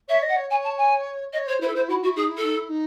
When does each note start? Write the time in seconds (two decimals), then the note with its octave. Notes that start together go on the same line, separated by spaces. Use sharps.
0.08 C#5 E5
0.23 D#5
0.28 F#5
0.36 C#5
0.50 C#5 G#5
0.64 A5
0.77 G#5
1.32 C#5 D#5
1.47 C5 C#5
1.61 E4 C5
1.67 A4
1.75 E4 C5
1.89 E4 F#4
2.03 E4 F#4
2.16 D#4 G#4
2.29 E4
2.37 A4
2.43 D#4
2.56 E4
2.69 D#4